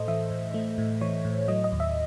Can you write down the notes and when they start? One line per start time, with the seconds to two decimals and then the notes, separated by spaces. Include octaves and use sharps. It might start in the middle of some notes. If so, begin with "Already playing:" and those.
Already playing: A2 A3 A4 C5 D#5
0.08 E3 E5
0.31 A2
0.54 A3
0.78 A2
1.01 E3 C#5
1.25 A2
1.48 F#3 D#5
1.64 D#5
1.72 D#2
1.80 E5